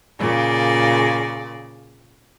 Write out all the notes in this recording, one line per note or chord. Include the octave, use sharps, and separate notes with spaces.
A#2 C#3 D5